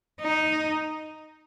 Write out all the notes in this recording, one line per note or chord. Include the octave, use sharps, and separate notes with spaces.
D#4